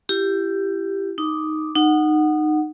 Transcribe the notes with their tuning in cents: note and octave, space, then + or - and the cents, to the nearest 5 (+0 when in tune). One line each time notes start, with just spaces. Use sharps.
E4 +30 G4 +0
D#4 +0 D6 +0
D#4 -20 F#5 +0